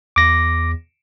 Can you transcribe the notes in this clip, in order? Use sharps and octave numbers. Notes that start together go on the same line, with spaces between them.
E2 D6 A#6